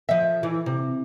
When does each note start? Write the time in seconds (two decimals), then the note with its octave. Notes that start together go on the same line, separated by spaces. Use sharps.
0.09 F3 E5
0.43 E3
0.66 C3